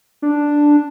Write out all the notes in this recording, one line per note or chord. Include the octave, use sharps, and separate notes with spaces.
D4